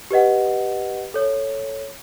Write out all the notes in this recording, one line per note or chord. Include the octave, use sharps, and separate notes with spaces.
G4 B4 D#5 F#5
A4 C#5